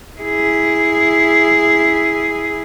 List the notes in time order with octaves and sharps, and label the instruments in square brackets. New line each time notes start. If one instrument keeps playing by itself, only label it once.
[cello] E4 G#4